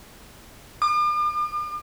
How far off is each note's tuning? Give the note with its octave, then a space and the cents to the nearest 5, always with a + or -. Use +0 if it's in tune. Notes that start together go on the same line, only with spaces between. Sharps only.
D6 +45